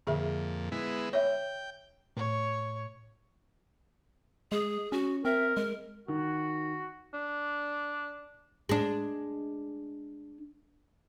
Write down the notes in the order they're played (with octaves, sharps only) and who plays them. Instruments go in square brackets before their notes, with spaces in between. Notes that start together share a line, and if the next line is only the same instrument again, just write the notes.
[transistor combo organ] F2 A#2 [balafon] D3 G#4 E5
[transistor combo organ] G#3 B3 E4
[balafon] C#5 E5 [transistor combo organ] G5
[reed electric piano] A2 [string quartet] C#5
[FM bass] G#3 [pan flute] G#4
[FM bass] C#4 [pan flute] F#4
[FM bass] C4 [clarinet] A#4 [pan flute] E5
[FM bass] G#3 [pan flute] A#4
[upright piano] D#3 [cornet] F#4
[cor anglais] D4
[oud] G#3 D4